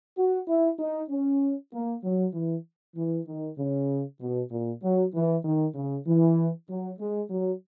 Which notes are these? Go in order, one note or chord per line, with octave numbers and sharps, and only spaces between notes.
F#4
E4
D#4
C#4
A#3
F#3
E3
E3
D#3
C#3
B2
A#2
F#3
E3
D#3
C#3
E3
F#3
G#3
F#3